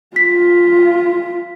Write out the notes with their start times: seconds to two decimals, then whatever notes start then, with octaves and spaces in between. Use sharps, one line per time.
0.16 F4 B6